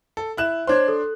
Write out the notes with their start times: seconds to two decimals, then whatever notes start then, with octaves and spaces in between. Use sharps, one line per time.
0.17 A4
0.37 E4 F#6 E7
0.67 D4 C5 C#5 C6 G#6
0.88 A4